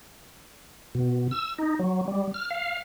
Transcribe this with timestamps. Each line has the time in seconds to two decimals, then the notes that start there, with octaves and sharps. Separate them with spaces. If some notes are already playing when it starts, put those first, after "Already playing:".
0.95 B2
1.31 E6
1.58 D#4
1.79 F#3
2.08 G3
2.34 F6
2.51 F5